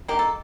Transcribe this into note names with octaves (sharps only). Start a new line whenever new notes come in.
D#3 A#3 G4
A4